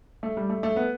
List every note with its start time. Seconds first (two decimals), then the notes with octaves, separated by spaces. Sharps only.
0.23 A3
0.37 G3
0.50 A3
0.63 A3
0.76 B3